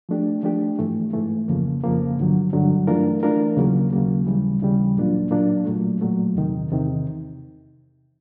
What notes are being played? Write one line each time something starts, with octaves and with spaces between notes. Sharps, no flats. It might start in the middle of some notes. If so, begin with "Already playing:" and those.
F3 A3 D4 G4
F3 A3 D4 G4
G#2 E3 A3
G#2 E3 A3
F2 C#3 F3 A#3
F2 C#3 F3 A#3
G2 D3 F#3
G2 D3 F#3
E3 A3 D4 F4 A#4
E3 A3 D4 F4 A#4
D#2 C#3 F#3 A#3
D#2 C#3 F#3 A#3
D#2 C#3 E3 G3
D#2 C#3 E3 G3
A#2 F#3 A#3 D4 F4
A#2 F#3 A#3 D4 F4
A#2 F#3 A3
A#2 F#3 A3
E2 C3 D#3
E2 C3 D#3